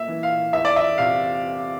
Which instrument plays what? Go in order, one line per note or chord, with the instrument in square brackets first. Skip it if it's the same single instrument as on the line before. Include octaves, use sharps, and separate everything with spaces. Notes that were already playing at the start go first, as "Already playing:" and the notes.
Already playing: [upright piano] A#3 E5
E3
F5
E2 E5
D5
E5
C3 F5